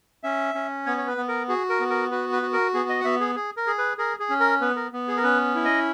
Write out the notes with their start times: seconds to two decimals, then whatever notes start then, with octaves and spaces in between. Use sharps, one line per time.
0.24 C#4 E5
0.55 C#4
0.86 B3 C#5
0.97 C#5
1.07 B4
1.17 B3
1.28 A#4
1.48 F#4 G#4
1.69 A#4
1.80 B3
1.90 A#4
2.11 F#4 B4
2.32 B4
2.42 F#4
2.53 A#4
2.74 B3 G#4
2.89 D#5
3.01 F#5
3.05 B3 E5
3.20 G#4
3.36 G#4
3.57 A#4
3.67 G#4
3.78 B4
3.98 G#4 A#4
4.20 G#4
4.29 C#4
4.40 A#4
4.61 B3 B4
4.76 A#4
4.93 B3
5.08 G#4
5.17 A#4
5.23 C#4 B4
5.55 E4
5.65 D#5